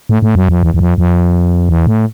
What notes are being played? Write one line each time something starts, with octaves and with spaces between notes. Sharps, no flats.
A2
A2
F#2
F2
E2
E2
F2
F2
E2
A2